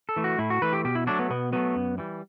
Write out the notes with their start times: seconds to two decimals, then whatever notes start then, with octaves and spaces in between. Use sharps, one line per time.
0.09 A4
0.16 E3 A3
0.24 F#4
0.39 A2 E4
0.50 F#4
0.62 E3 A3 B4
0.73 G4
0.85 B2 G4
0.95 E4
1.07 F#3 A3 D4
1.19 B3
1.30 B2 B3
1.52 F#3 A3 B3
1.75 F#2
1.98 E3 G3